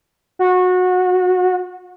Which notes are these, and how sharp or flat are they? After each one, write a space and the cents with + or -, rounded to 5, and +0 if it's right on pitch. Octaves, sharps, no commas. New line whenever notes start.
F#4 -20